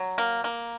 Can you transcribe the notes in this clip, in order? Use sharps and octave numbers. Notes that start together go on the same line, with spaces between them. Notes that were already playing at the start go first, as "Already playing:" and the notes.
Already playing: F#3
A#3
A#3